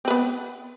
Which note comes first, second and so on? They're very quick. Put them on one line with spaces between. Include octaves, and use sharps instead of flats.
C4 B4 B3